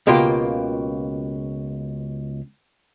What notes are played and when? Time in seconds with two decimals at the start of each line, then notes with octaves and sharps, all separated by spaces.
0.07 C#2 B2 A#3 F4 G4 C6